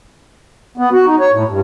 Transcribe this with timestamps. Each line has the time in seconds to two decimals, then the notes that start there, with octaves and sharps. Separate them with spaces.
0.78 B3
0.92 F#4
1.06 D#4
1.20 C#5
1.32 A2
1.49 G2